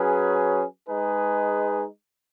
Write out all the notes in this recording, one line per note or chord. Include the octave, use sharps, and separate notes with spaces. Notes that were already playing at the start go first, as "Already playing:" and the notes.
Already playing: F#3 C#4 G#4 B4
G#3 D#4 G#4 B4